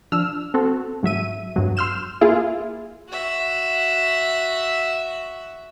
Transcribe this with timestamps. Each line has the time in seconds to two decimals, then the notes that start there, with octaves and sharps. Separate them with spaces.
0.12 F3 D4 E6 F6
0.54 C4 F#4 A4
1.03 G#2 F#3 E5 D#7
1.56 G2 F#3
1.77 C6 E6 F6 G6 E7
2.21 A#3 E4 F4 G#4
3.09 F#4 E5